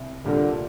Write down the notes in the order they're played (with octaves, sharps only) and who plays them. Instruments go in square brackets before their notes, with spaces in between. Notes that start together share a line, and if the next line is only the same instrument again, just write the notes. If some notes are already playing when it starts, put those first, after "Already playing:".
Already playing: [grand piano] C2
[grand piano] A#2 G3 A#3 [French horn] D3